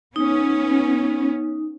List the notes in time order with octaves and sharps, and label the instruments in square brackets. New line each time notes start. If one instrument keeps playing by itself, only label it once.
[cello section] B3 C#4 [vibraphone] D#4